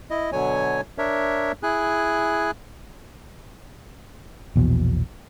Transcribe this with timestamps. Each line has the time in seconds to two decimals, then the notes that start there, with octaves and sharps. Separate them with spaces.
0.10 E4 D#5
0.32 B2 D3 F#3 C#5 G#5
0.98 D4 A#4 C#5 E5
1.63 E4 G#4 G#5 F#6
4.56 A#1 E2 B2